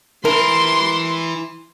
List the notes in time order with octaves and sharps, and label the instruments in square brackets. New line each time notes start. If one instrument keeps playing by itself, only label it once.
[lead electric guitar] E4 B4 [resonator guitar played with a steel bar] A#4 [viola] C6